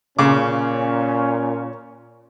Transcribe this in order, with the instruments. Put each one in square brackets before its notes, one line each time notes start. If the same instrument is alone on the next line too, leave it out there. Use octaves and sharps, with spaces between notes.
[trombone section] A#2 C#4 [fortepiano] C#3 D6